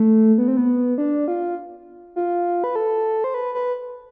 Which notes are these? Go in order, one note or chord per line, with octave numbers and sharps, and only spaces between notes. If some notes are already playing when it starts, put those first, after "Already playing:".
Already playing: A3
B3
C4
B3
D4
F4
F4
B4
A4
C5
B4
B4